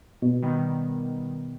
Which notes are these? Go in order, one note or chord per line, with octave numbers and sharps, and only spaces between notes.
B2
D#3 G3 B3